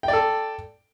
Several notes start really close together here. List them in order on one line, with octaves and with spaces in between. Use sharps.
G5 D5 A4